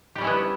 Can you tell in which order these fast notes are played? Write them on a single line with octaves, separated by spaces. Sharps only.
G4 G3 C#4 E4 B3